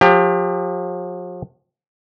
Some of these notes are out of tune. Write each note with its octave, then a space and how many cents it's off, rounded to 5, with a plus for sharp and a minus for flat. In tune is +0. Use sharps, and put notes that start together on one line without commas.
F3 +40 G4 +25